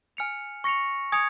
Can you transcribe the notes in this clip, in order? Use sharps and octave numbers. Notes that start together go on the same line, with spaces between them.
G#5 F6 C#7 F7
C#6 A#6 C#7 F7
G#5 D#6 G#6 C#7 F7